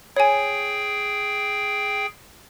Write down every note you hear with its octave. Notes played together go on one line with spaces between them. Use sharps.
G#4 C#5 G5 G#5